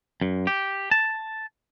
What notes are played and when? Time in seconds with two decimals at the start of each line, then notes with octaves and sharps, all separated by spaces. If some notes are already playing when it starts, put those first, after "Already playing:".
0.21 F#2
0.47 G4
0.91 A5